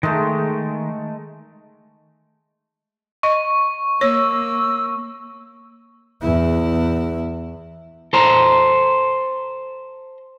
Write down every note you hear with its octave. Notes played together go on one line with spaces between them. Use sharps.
D#3 G#3 A3
D#5 C#6
A#3 C#5 E6
E2 E4
A4 C5 A#5